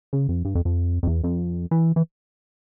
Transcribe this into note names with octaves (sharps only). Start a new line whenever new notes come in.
C#3
F2
G2
F2
F2
F2
E2
F2
E3
E3